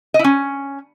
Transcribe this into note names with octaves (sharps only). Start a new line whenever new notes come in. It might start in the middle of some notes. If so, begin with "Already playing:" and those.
D#5
E4
C#4